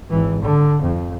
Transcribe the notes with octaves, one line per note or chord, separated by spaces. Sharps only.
G#1 E3
D3
F2